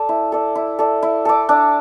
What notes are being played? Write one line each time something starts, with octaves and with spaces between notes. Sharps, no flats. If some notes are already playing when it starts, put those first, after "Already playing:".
Already playing: A4 D5
E4
A4 D5
E4
A4 D5
E4
A4 D5
D4